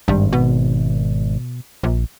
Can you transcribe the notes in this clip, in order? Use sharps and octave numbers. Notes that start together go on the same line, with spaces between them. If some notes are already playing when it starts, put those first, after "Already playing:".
G#1 G2
B2
A#1